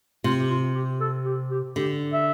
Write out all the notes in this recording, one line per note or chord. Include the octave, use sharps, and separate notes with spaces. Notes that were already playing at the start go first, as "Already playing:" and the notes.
C3 F4
G4
F4
G4
A4
G4
G4
D3 G4
E5